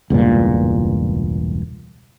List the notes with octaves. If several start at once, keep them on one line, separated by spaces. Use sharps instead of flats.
E1 C#2 G2 A#2